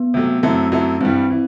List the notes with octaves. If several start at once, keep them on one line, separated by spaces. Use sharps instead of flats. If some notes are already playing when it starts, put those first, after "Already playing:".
Already playing: B3
C3 F#3 A3
F#2 F#3 A3 C4 E4 A4
F#2 F#3 A3 E4 A4
G2 E3 G3 C4
E3